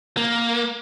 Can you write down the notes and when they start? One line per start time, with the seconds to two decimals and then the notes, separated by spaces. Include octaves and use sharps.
0.17 A#3